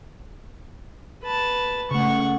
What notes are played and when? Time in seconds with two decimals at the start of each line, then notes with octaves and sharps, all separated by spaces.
1.23 B4 A5
1.91 C#3 A3 F#5 C#6